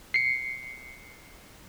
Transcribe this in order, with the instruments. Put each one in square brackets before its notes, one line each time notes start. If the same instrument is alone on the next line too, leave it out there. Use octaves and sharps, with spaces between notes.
[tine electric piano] C7 C#7